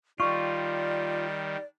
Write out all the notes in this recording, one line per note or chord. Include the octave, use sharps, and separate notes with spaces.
D#3 G3 F4 D5 C#6